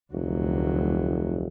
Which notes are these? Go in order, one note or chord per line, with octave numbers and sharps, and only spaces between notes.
F1 D2 F#3